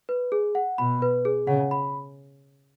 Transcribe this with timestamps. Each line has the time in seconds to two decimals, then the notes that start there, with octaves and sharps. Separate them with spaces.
0.09 B4
0.32 G#4
0.55 F#5
0.78 B2 B5
1.02 B4
1.25 G#4
1.47 C#3 F#5
1.71 B5